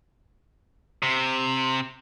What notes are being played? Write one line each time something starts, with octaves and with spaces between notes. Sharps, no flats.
C3